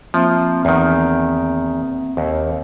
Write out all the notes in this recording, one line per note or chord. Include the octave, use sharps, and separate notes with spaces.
F3 A#3 C4 E5
E2 D#3
D#2